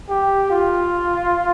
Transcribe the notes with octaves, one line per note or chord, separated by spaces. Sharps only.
G4
F4